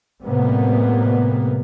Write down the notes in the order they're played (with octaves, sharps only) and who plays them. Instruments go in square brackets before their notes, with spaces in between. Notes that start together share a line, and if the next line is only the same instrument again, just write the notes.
[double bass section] A2 C3 G3 A#3 B3